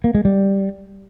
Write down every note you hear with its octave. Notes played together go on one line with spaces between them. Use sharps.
A#3
G#3
G3